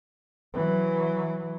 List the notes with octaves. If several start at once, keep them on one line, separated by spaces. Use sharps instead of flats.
E3 F#3